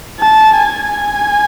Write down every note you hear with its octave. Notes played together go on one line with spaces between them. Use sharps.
A5
G#5